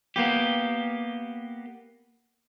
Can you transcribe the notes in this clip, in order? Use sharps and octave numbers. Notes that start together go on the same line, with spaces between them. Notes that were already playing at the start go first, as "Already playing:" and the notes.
A#3 B3 G4